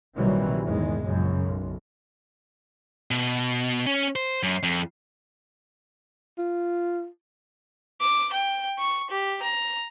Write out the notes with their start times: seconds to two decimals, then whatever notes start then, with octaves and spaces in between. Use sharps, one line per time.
0.17 A#1 C3 D#3 E3 F#3 G3
0.64 E2 G#2 D#3 G#3
1.07 A#1 F#2 C#3
1.42 B1
3.11 B2
3.86 C#4
4.16 C5
4.43 F#2
4.63 F2
6.38 F4
8.01 D6
8.33 G5
8.79 C#6
9.11 G4
9.43 A#5